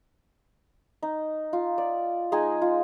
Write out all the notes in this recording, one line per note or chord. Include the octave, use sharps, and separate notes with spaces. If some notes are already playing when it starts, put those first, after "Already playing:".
D#4
F4
D5
G#3 D#4 G#4 G#5
F4